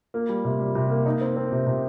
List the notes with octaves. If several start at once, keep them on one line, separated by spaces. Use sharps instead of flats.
A#3
G3
C3
G3
C3
A#3
D#4
C4
C4
C3
C3